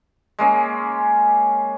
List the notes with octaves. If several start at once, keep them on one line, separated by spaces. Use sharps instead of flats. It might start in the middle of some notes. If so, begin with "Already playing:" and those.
G#3 A#3 C#4